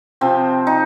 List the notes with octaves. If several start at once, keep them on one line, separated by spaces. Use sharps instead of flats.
C3 F3 C4
D#4